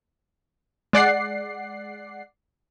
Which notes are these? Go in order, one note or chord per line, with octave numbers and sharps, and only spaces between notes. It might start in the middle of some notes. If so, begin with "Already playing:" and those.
G#3 D5 F#5 C7